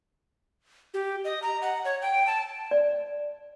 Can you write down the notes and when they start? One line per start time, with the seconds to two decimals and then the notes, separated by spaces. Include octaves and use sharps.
0.94 G4
1.25 D#5
1.43 A#5
1.62 F#5
1.85 C#5
2.02 G5
2.27 A5
2.71 D5